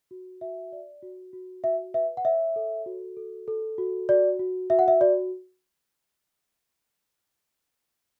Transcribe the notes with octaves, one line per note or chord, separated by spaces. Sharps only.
F#4
F#4 E5
D5
F#4
F#4
F#4 E5
B4 E5
F#5
C#5 E5
A4
F#4
A4
A4
F#4
F#4 D5
F#4
F#4 E5
F#5
E5
F#4 D5